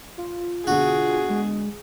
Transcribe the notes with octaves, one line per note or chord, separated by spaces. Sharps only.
F4
B2 D3 F#4 G#4
G#3